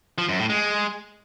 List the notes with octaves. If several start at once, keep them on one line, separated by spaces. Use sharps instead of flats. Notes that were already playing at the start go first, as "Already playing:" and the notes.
F3
F#2
A2
G#3